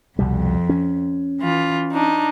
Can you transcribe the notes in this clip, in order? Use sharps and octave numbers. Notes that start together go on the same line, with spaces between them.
C2 F2 B2 G3
C#4
E3 F4
D4 D#4